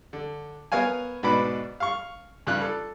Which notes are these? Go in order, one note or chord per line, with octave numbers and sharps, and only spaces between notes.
D3
B3 A#4 C#5 F5 G#5
G#2 B2 D4 B4 B5 D6
F5 C#6
G2 C#3 G3 F4 F#6
A4